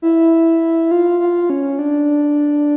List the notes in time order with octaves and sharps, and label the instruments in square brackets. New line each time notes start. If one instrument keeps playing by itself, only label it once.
[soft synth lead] E4
F4
F4
C#4
D4